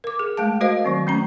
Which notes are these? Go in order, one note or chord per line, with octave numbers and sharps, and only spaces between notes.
A#4 D6
G#4
G#3 A3 F5 A5
F#4 A#4 C5 D#5 F5
D#3 F#3 C4
A3 C#4 A#5